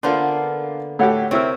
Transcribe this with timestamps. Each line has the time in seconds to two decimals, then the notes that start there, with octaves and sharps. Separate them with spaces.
0.03 D3 A#3 B3 D4 F4 A4 B4 C5
0.99 A2 F#4 G4 A4 C#5 F#5
1.31 C3 C4 E4 A#4 C#5 E6